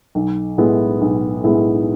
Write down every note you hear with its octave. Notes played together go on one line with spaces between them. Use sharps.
B1
A2 G#3 B3 E4
B1
A2 G#3 B3 E4